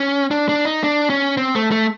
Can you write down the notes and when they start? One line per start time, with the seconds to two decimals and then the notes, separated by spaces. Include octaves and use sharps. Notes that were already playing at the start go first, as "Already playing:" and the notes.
Already playing: C#4
0.31 D4
0.49 D4
0.65 D#4
0.84 D4
1.10 C#4
1.37 C4
1.55 A3
1.72 A3